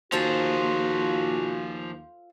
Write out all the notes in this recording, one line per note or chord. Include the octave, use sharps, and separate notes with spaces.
D#2 F3 F4 F#4 G#4 A4 C5